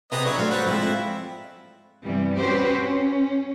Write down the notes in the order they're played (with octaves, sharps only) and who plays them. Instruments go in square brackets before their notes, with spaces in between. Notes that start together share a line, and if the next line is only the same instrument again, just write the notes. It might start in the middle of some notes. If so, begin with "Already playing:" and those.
[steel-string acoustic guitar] C3 G#4 B4 [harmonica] B3 D#5 A#5
[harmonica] F#3 B4 C#5 [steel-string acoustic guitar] D4
[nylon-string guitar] F#3 A3 [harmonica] F4
[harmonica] G3 B4 F#5 [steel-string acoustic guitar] C5
[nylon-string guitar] F3 G#3 C4 [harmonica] E4
[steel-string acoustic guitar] F2
[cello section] G2 C3 E3 G3 B3
C4 C#4 F#4 G4 B4 C5
C#4